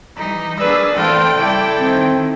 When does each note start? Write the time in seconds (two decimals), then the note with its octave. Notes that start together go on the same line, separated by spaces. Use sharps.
0.16 E3 G3 D#4
0.59 A#3 D4 G#4 B4 D5 E6
0.95 A2 E3 C4 F4 A4 G5
1.38 C#3 G3 E4 A4 D5
1.79 D#3 C4